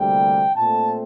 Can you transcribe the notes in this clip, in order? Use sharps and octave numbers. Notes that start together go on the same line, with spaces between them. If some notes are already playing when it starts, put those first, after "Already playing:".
Already playing: D2 C3 G3 A#3 G5
A#2 A3 C4 A5